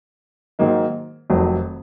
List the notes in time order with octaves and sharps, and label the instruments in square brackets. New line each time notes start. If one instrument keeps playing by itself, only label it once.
[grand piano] G#2 D#3 F#3 A#3 D#4
F1 F2 D#3 F#3